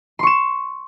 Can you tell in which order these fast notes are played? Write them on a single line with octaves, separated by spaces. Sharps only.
C6 C#6 E7